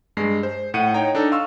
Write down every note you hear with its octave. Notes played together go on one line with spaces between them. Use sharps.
G2 G#3 C7
C5
A2 F#5 C#7 D#7
D#4 C#5 G5 A#5
D4 D#4 A4
F5 C6 C#6 E6